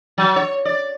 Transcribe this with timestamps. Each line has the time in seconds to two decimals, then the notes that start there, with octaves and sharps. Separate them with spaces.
0.18 F#3
0.36 C#5
0.65 D5